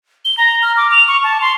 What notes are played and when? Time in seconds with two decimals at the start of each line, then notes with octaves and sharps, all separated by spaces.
0.25 G7
0.38 A#5
0.63 F6
0.77 D6
0.91 F7
1.08 C#6
1.23 A5
1.41 C6